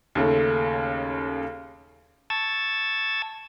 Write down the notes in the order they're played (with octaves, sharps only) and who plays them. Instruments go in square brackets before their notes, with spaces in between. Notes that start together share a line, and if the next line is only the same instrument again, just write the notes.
[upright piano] D#2 C#3 A3
[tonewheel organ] A5 C#6 E6 G#6 A6